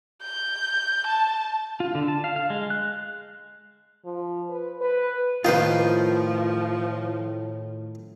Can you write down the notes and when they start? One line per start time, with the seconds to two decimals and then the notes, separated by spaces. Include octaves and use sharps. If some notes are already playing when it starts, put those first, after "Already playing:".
0.22 G6
1.06 A5
1.80 F4
1.95 D3
2.08 A5
2.24 F5
2.36 F5
2.50 G#3
2.70 F#6
4.05 F3
4.49 B4
4.81 B4
5.45 A2 D#3 F3 F4 B4 C5